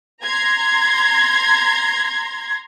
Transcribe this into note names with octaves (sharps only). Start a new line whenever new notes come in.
A#5 C6 G#6